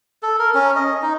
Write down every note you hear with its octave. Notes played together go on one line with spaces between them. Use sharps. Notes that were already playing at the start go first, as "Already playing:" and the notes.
A4
A#4
C#4
D#5
D#4